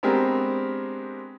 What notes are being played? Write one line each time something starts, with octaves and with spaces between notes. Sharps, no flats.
G#3 B3 C4 D4 G4 A#4